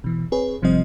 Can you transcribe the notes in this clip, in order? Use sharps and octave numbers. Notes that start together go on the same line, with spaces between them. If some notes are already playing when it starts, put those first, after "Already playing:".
B2 E3
C4 G#4 B4 C#5
G1 C3 F3 G3 C4 D#5